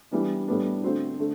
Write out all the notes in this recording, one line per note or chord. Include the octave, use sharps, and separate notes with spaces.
E3 G3 B3 D4
A2 G3 B3 D4
D3 A3 C4 F#4 C5
D3 A3